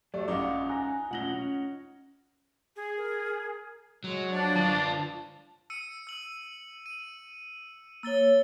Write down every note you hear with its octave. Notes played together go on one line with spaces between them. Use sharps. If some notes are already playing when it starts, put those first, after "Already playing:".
F#3 A3 G4 A4 D5
A#1 C#4 D#4 F4 F5 F#5 D6
G#5 A#5 F#6 A#6
B1 A3 C#4 F4 F#5 A#6 F#7 G7
C#4
G#4
A#4
F#3 G#3
F3 D4 D5
D3 F4 A5
E6 C#7 D#7
E6 F#7
D#7
A#3 C#5 E6 A6 G7